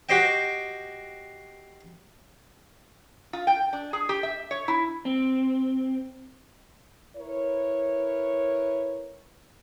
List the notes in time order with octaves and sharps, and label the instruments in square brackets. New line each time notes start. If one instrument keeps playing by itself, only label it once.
[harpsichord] F#4 G4 C5 D#5 G5
[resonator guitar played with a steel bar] F4
G5
D4
G#4
G4
E5
C#5
E4
[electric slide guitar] C4
[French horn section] E4 A#4 B4 C#5